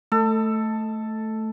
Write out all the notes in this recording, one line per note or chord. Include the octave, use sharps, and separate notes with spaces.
A3 A4